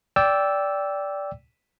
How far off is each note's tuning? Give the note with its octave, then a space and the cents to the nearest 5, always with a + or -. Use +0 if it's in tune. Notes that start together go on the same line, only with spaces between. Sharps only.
D5 -15 G5 +0 E6 +0